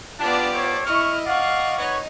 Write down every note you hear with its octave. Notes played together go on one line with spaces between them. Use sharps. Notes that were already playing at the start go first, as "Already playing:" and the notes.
B3 D4 F4 G4 D5
A4 C5 C#5
E4 D#5 C#6 F6
D5 F5 F#5 C#6
D#4 B4 C#5 D#5